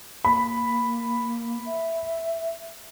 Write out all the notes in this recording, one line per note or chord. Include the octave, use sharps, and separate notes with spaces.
A#3 B5
E5